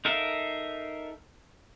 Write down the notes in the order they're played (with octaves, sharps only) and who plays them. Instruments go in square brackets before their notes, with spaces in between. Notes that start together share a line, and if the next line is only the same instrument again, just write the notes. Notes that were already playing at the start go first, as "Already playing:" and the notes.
[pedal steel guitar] D#4 A4 A#4 E5 F5